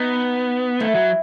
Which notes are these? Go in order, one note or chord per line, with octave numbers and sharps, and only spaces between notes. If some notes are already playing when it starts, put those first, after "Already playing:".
Already playing: B3 D#4
A3 E4
F#3